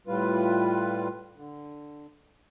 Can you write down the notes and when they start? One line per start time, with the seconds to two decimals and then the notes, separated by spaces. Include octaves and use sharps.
0.07 A2 G3 F4 B4
1.36 D3